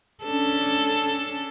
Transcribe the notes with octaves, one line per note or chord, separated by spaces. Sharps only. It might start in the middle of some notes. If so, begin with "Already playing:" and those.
C#4 D4 A4